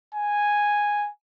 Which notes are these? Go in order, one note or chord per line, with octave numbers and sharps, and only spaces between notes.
G#5